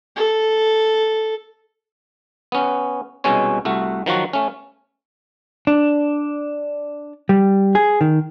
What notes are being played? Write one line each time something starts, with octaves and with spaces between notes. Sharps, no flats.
A4
B3 C#4
C2 B2 G#3 C#4 C#5
C2 A3 F#4
D#3 F3 F#3 F#4
A3 C#4
D4
G3
G#4
D#3